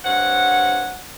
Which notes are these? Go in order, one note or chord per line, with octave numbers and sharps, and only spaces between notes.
G2 C4 C#5 F#5